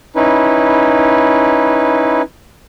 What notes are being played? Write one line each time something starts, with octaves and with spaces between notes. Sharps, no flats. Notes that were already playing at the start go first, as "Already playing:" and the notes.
C#4 D#4 E4 B4